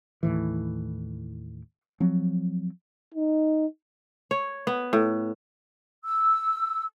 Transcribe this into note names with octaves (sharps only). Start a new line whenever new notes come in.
D#2 A2 E3
F3 F#3 C4
D#4
C#5
B3
A2
E6